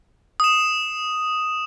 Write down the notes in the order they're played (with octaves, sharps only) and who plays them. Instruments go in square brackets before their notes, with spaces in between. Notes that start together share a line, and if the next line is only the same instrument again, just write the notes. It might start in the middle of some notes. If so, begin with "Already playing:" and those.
[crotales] D#6 E7